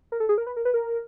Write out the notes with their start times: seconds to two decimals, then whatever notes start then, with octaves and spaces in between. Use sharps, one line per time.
0.12 A#4
0.20 A4
0.29 G#4
0.38 A#4
0.47 B4
0.56 A#4
0.65 B4
0.74 A#4